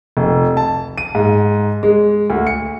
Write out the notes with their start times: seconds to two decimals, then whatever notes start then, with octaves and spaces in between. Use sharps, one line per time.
0.17 F1
0.57 A5
0.98 D#7
1.15 G#2
1.83 G#3
2.30 D2
2.47 C#7